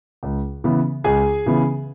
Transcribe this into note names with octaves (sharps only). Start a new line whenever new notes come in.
C#2
C#3 E3 B3
C#2 G#4 G#5
C#3 E3 B3